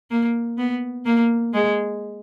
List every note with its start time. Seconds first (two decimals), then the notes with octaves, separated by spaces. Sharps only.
0.11 A#3
0.58 B3
1.06 A#3
1.54 G#3